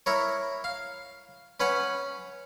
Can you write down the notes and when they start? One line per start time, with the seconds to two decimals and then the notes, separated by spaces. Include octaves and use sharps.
0.06 E4 A#4 C#5
0.64 F5
1.60 C#4 B4 C#5 F#5